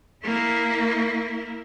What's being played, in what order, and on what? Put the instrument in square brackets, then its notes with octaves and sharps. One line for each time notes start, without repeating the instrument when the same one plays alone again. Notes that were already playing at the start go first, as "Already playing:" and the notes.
[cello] A#3 E4